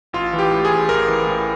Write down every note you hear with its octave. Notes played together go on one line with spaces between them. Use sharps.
A1 F4
E3
G4
A2
G#4
A1
A1 A#4
E3
A2